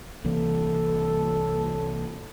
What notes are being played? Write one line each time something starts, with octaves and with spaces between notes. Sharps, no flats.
C2 E3 A#3 A4